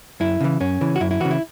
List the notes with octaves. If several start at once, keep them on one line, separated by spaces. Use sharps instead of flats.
F#2 E4
C#3 E3
F#2 C#4
C#3 E3
F#4
F#2 E4
E4
C#3 E3 F#4
E4